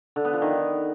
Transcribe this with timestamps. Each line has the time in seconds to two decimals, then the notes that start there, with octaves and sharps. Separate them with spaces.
0.16 D3
0.25 B3
0.33 F3
0.42 D#3